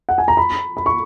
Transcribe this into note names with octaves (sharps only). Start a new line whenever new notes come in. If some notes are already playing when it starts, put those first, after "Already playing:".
F#5
G#5
A#5
B5
B5
C#6